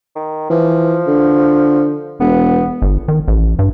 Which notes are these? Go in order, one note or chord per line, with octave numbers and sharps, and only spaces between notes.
D#3
E3 F3
D3
E1 B3
G1
D#3
A1
G2